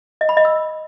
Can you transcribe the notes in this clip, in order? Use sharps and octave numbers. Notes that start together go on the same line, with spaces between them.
D#5
B5
D#5
E6